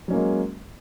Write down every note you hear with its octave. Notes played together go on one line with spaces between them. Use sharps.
F#3 G#3 A#3 C#4